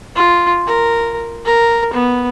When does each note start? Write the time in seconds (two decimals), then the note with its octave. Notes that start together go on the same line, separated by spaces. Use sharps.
0.16 F4
0.67 A#4
1.46 A#4
1.93 B3